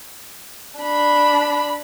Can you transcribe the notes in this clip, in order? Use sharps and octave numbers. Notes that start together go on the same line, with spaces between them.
D4 B5